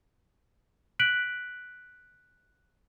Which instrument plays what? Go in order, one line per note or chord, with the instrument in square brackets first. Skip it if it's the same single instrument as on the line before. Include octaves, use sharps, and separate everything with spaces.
[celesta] F#6 B6 D7 F#7